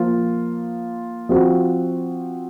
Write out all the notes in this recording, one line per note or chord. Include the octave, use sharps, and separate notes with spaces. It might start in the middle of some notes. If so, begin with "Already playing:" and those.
Already playing: F3 A#3 F4
F3 C4 F#4